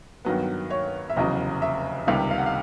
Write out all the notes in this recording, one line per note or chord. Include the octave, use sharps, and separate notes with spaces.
G2 D#3 F#3 B3
C#5
E5
F1 E2 C#3 F#3 D#5
E5
C#2 C3 D#3 G3 F5
F5
F#5
F5